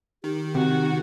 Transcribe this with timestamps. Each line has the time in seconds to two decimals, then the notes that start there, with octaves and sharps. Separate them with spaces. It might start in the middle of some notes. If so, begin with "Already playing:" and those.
0.24 D#3 G4
0.55 C3 F#4 G4